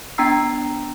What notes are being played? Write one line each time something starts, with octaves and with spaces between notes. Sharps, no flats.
B3 D4 G5 A#5 E6 C7